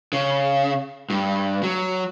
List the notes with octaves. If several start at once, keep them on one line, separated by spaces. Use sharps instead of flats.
C#3
G2
F#3